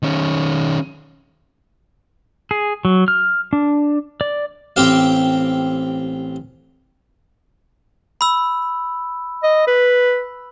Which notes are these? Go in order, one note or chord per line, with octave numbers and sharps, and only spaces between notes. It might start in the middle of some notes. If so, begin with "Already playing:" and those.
D#3 C#4
G#4
F#3
F6
D4
D5
A1 C4 G4 F5
B5 E6
D#5
B4